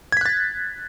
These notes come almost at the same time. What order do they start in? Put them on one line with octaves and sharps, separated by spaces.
G#6 B6 F#6 A6